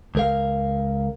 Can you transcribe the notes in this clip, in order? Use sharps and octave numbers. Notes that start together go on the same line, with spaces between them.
C#2 A#4 F5